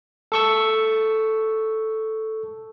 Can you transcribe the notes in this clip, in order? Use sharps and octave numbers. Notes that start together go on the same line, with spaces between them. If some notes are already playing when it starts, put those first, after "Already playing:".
A4 C#6 E6